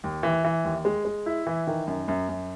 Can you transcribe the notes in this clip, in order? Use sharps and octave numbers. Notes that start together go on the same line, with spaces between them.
D#2
E3
E3
D#2
G#3
G#3
E4
E3
D#3
F#2
F#2
F#2